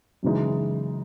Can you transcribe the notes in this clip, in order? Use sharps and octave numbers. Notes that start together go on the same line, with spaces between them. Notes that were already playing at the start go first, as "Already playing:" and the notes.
F#2 C#3 E3 G#3 D#4